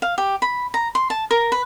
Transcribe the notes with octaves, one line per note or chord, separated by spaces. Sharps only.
F5
G4
B5
A#5
C6
A5
A#4
B4